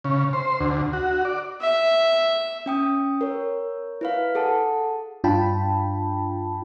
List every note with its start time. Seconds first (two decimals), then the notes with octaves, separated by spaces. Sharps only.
0.04 C#3
0.33 C5
0.60 D2
0.93 F#4
1.25 D5
1.61 E5
2.66 C#4 G5 D#6
3.21 A#4 C#5
4.01 E4 B4 F5
4.35 G#4 A4 F#5 A5
5.24 G2 D4 F4 G5 A5 B5